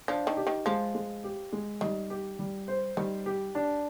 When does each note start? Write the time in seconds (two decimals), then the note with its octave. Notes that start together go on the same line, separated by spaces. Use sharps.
0.08 F3 D4
0.27 D#3
0.37 G4
0.47 D#3
0.66 F3 G#3
0.95 G#3
1.24 G4
1.52 G#3
1.81 D#3 G3
2.10 G4
2.39 G3
2.68 C5
2.97 D#3 G3
3.26 G4
3.55 D4